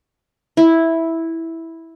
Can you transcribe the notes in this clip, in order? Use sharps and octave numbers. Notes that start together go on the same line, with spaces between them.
E4